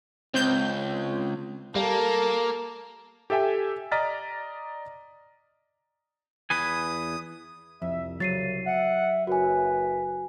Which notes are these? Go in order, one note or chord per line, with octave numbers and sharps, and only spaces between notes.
C#2 C4 G6
G3 A#3 A4 A#4
G4 A4 E5 G5 G#5
D5 D#5 A#5 F6 A6 B6
E2 B4 G#5 D#6
C2 F2 E5
C#3 F#3 A6 C7 D#7
E5 F#5
F#1 F#2 F#4 B4 G#5